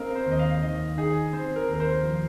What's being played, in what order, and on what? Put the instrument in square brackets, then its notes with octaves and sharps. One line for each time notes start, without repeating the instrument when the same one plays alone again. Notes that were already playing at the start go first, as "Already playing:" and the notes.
Already playing: [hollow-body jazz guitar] C4 [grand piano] A#4 D#5 F5
[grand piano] C5
[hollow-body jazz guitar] D#2 [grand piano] D#5
[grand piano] F5
[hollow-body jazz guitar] D#3 [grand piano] D#5
[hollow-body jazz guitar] D#4 [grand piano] G#4
[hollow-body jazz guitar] C4 [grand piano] C5
[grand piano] A#4
[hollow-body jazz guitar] D#2
[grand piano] A#4
C5
[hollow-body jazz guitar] F3